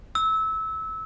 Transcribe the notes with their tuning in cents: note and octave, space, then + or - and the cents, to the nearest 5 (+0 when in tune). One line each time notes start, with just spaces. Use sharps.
E6 -20